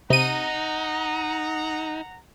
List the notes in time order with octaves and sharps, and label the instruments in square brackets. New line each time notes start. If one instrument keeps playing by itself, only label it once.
[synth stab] C3 D#7 [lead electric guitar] D#4 [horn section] F#5 A#5